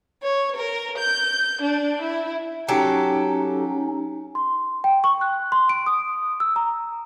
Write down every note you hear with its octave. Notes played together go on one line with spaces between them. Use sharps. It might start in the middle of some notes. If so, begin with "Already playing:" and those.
C#5
A#4
G6
D4
E4
F#3 C#4 D#4 G4 A4
C6
G5
C#6
F#6
C6
D7
D#6
E6
A#5